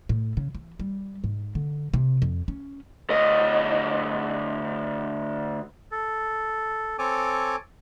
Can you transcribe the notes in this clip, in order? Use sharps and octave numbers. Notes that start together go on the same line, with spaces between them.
A2
C#3
E3
G3
G#2
D3
C3
F2
C#4
D2 D#5
A4
C4 A4 C#5 G#5 D6